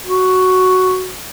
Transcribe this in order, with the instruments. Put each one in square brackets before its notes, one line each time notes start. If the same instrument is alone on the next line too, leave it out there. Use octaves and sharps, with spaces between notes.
[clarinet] F#4